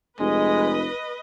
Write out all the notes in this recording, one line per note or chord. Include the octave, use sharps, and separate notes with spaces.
F1 G#3 B4 D#5